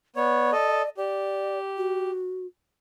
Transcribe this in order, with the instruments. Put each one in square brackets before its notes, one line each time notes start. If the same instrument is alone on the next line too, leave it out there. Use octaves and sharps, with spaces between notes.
[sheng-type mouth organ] B3 C#5 [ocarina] D5
[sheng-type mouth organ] A4 D#5
[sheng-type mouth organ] G4 [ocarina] D5
[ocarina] F#4